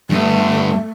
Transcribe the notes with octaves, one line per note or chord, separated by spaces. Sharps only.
G2 A3 B3